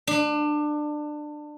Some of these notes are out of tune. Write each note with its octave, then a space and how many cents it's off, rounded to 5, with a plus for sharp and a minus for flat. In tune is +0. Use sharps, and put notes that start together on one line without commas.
D4 +25